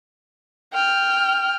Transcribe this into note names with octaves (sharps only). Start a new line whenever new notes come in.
G5 F6